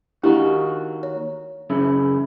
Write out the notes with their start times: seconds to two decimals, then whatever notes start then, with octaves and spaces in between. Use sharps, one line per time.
0.24 D#3 A#3 D4 E4 F#4 G4
1.03 C#5
1.70 F#2 C#3 E4